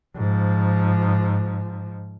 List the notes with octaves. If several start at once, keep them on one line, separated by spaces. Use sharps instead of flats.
G#2 F3